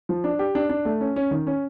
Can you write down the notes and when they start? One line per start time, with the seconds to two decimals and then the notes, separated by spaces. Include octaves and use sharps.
0.09 F3
0.24 D4
0.39 G4
0.55 D4
0.70 D4
0.85 A3
1.01 C#4
1.16 C#4
1.31 D#3
1.47 C#4